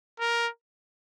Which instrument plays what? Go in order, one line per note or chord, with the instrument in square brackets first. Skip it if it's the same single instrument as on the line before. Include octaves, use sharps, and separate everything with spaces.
[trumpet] A#4